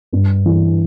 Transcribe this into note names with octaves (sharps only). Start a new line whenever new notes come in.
G2
E3